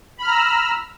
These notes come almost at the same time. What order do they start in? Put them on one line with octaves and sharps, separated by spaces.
B5 F6 A#5 E6